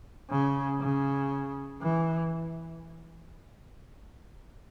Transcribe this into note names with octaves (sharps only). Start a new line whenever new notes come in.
C#3
C#3
E3